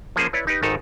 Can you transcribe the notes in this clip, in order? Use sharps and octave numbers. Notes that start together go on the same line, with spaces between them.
F3 A#3 C#4 G#4 C5
E4 B4 C#5 D5
D#4 G4 B4
G#1 G#2 D#3 D#4 A4 A#5